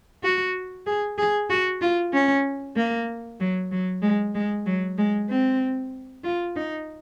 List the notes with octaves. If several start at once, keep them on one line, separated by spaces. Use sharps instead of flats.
F#4
G#4
G#4
F#4
F4
C#4
A#3
F#3
F#3
G#3
G#3
F#3
G#3
C4
F4
D#4